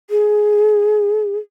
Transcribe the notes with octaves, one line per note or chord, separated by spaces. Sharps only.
G#4